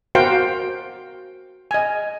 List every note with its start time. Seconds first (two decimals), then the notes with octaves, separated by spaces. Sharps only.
0.15 F#4 A#4 C5 F5 G5
1.71 D#5 G#5